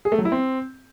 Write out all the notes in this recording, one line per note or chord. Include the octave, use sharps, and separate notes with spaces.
G#4
A3
F#3
E4
C4